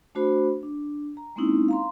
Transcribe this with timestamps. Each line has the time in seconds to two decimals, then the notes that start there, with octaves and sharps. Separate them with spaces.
0.15 A3 D4 F#4 C5 B5
0.63 D4
1.17 A#5
1.36 G#3 A#3 C4 C#4 D#4 E4
1.68 F5 A#5 C6